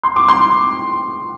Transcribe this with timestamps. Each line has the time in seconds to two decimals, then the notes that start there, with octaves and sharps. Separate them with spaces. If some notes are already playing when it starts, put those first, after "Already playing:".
0.03 C6
0.16 D6
0.28 C6